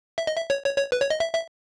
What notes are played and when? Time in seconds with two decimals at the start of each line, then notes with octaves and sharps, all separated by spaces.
0.18 E5
0.27 D#5
0.36 E5
0.50 C#5
0.65 C#5
0.78 C#5
0.92 B4
1.02 C#5
1.10 D#5
1.20 E5
1.34 E5